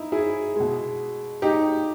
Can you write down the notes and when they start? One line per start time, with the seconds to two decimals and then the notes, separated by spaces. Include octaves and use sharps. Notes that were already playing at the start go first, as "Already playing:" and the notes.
Already playing: D#4 E4
0.12 E4 G#4
0.56 B2 G#3
1.42 D#4 G4